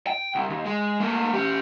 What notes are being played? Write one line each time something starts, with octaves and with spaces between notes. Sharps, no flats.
G5
C2
D#2
G#3
A3 A#3
C#4 G4